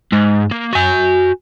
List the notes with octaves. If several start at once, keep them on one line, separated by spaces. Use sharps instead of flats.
G#2
A#3
F#4 G#5